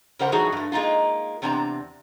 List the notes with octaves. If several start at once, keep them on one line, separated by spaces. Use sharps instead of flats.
C#3 G4 A#4 C5 F#5
A2 E3 F#3 D#4 F#4 G#4
G2 A3
G#3 A#3 C#4 D#4 F4
E2 C3 C4 D4 G#5 A#5